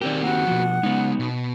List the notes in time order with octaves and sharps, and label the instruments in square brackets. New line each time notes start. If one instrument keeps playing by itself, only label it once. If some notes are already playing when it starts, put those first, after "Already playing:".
[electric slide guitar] D#3 C4 G4 [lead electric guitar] A#4 D5
[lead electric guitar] A#3 F#4 [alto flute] F#5
[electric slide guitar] B2 F3
[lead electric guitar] C#3 G#3 [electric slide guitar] B3 D#4
[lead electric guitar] B2